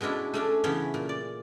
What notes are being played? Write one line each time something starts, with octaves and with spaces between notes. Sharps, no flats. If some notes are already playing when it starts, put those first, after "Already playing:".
B2 G#3 C#4 D4 E4
A3 C#4 D4
C#3 E3 B3 C#4
A#2
D5